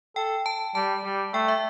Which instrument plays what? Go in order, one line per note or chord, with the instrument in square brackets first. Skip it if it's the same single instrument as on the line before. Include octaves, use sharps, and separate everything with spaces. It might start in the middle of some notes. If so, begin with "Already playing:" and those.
[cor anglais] A4 [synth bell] G5
[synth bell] A5
[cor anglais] G3 [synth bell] A5
[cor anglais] G3
[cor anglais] A3 [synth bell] G5
[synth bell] E5